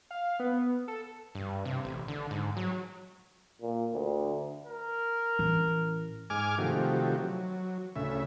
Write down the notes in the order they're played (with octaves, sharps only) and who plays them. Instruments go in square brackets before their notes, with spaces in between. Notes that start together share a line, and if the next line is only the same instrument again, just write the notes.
[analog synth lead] F5
B3
A4
[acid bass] G2
C3
A1
D3
G#2
F#3
[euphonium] A#2
D2
[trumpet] A#4
[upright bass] A1 [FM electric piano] E3
[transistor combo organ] G#2 G#5 D6 F6
C3 D#3 F3 A3 F#4 G4
F#3
D2 A2 C#3 E5